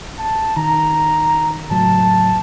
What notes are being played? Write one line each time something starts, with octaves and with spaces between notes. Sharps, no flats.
A5
D#3 A#5
F#1 A2 F#3 A5